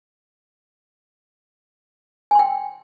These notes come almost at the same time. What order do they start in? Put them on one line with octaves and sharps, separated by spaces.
G#5 C6 G5